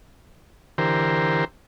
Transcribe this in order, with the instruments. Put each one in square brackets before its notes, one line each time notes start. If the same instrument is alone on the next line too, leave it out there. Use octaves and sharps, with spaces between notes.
[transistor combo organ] D3 E3 G4 A#4 C5